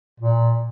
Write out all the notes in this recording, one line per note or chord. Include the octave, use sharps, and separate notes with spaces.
A#2